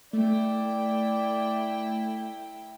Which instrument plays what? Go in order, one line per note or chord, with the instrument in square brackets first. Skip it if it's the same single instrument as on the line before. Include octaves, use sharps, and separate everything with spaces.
[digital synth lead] A3 [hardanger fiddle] E4 G5 [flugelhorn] D5